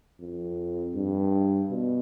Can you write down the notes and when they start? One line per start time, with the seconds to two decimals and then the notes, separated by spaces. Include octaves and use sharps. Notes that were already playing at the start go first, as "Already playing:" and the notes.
0.20 F2
0.94 G2
1.70 B2